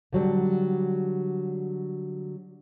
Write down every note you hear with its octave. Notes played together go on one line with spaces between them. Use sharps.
D3 F#3 G3